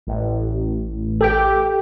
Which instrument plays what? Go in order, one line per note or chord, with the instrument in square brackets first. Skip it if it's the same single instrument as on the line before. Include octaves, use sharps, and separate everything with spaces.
[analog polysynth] A1
[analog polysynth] G4 [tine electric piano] A4 G5